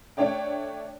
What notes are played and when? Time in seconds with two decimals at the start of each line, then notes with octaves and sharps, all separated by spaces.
0.17 A3 D4 C#5 D5 G5